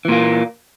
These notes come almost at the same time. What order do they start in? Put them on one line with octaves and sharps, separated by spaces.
E3 A#2 A#3